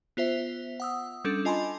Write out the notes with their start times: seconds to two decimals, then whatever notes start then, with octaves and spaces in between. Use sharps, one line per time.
0.17 B3 F4 C5 E5
0.80 F#5 D#6 E6
1.25 G3 C#4 D4 A4
1.45 F4 D#5 G#5 A5 B5 C6